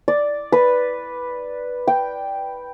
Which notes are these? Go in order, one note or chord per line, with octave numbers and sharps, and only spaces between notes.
D5
B4
G5